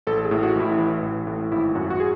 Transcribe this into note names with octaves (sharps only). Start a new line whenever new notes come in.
A1 A4
G#4
A2
F#4
A1 E4
E3
A1
A2
G#1 E4
F#2 F#4
F#4
G#4